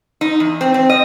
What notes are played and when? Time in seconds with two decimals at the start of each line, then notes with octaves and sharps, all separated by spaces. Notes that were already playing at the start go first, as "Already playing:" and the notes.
0.21 D#4
0.40 E2
0.61 C4
0.74 C4
0.90 D#5